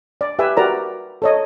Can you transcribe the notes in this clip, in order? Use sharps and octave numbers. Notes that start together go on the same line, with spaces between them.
D5
G4 B4 E5 G#5
F#4 G4 A#4 B4 D5 A#5
A4 C#5 D#5